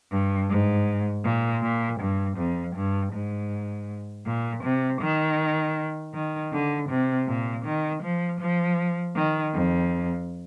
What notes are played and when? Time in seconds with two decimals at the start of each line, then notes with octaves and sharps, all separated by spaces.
0.11 G2
0.49 G#2
1.24 A#2
1.62 A#2
2.00 G2
2.38 F2
2.76 G2
3.13 G#2
4.26 A#2
4.63 C3
5.01 D#3
6.14 D#3
6.52 D3
6.89 C3
7.27 A#2
7.65 D#3
8.03 F3
8.40 F3
9.16 D#3
9.54 F2